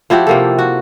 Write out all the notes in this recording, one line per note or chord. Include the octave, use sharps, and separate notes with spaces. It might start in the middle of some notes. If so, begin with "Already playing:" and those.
F3 E4 F#4 G4
C3 A#3 A4
F#4